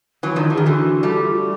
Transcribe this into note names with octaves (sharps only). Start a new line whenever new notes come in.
E3 F#3
D#3 F3 D4
E4
E3
D#3 G#4
D3 E3 F#4
G3 A3
G4
F4
F#4